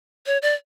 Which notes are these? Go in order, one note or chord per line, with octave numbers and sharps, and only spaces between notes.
C#5
D5